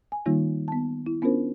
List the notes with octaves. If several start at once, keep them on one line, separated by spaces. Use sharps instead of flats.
G#5
D#3 G3 A#3 D#4 F4
B3 A5
E4
B3 C#4 D4 F4 A#4 C5